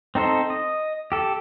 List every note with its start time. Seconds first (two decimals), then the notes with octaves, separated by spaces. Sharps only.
0.15 C4 D#4 A4 C5
0.50 D#5
1.12 G4 A4